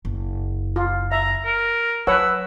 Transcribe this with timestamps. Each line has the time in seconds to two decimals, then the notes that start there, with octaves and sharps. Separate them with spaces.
0.05 F#1
0.76 F4
1.12 E5 A#5
1.45 A#4
2.07 F#3 B4 C#5 F#5 E6